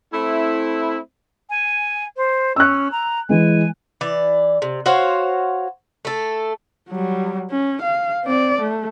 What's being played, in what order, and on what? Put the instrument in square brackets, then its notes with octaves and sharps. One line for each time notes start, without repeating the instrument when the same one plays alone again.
[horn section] A3 C4 E4
[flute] G#5
C5
[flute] C#4 [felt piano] E6 F#6
[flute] A#5
[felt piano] E3 G#3 [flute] G#5
[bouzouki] E3 D5
C3
F#4 C5 C#5 F5
A3 A4
[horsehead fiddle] F#3 G3
C#4
F5
C4 D5
A3